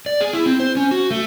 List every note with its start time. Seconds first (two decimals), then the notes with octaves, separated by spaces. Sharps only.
0.06 D5
0.21 G#4
0.33 E4
0.46 C4
0.60 C5
0.77 C#4
0.91 F#4
1.11 A3